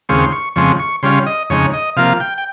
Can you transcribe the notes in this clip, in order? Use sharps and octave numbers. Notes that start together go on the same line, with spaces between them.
D#2 C#3 G#3 C4 F4 C#6
C6
C#6
F2 C#3 F3 G#3 C4 C#6
C#6
C#3 G3 C#4 F4 C6
D#5
F2 C#3 G#3 D#4 C#5
D#5
C3 F3 A#3 F4 F5
G5
G5